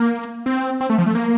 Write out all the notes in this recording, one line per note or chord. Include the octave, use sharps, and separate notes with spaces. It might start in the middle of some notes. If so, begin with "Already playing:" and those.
Already playing: A#3
C4
C4
A3
F3
A3
A#3